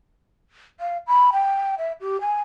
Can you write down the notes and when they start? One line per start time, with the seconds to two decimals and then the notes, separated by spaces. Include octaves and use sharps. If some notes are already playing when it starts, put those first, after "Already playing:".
0.80 F5
1.07 B5
1.33 G5
1.78 E5
2.01 G4
2.21 G#5